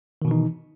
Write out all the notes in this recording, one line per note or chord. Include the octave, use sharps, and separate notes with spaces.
B2 D#3 E3 D#4